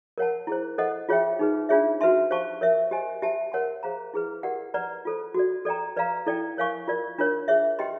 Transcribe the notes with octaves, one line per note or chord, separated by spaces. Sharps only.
A#4 C#5 F#5 A5
E4 G#4 C5
A4 C5 D#5 F#5
F4 G#4 C#5 E5 G5
D#4 G#4 B4
D4 F4 G#4 C#5 E5
F#4 B4 E5 A5 C6
G4 C5 F5 A5 C#6
A#4 C#5 E5
G4 C5 D#5 G#5
G4 C5 E5 A5
A#4 C#5 F#5 A5 C6
G#4 C5 F5 A#5
E4 G#4 B4
G4 A#4 D5 F#5
B4 D5 F#5 A#5
F4 A4 C5
F#4 A4 D5
A4 D5 G5 A#5
B4 D5 F5 A#5
E4 A4 D5 G5
A#4 C#5 F5 G#5 C#6
F4 A#4 D5
D4 F4 A#4 C#5
G#4 C#5 E5
G4 B4 D#5 G5 C6